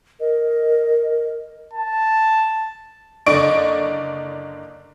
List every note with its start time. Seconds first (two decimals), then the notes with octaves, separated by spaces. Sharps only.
0.20 A#4 D#5
1.73 A5
3.26 F#1 D3 D5 D#5 C#6 D7